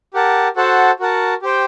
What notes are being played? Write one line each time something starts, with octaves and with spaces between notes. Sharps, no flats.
G4 A#4 F#5 A5
F#4 A4 C5 F#5 A5
F#4 A#4 F#5 A5
G4 C5 G5